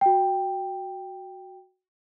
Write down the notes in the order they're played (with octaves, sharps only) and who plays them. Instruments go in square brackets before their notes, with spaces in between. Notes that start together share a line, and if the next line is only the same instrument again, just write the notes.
[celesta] F#4 G5